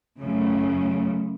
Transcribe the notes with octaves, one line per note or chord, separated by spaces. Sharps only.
F#2 C#3 A3